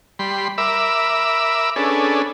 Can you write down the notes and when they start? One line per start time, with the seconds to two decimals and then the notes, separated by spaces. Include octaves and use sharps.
0.19 G3 B5 C6
0.58 A#4 E5 B5 D6 E6
1.76 C#4 D4 G#4 A4 B4